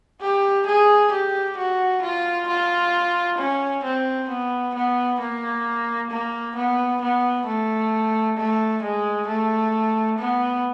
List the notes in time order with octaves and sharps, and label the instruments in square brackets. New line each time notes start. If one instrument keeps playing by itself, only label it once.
[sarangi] G4
G#4
G4
F#4
F4
F4
C#4
C4
B3
B3
A#3
A#3
B3
B3
A3
A3
G#3
A3
B3